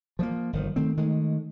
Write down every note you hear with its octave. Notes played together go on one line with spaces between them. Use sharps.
F3 F#3 A#3
G1 D#3 F3
D#3 A3 C4
D#3 G#3 A3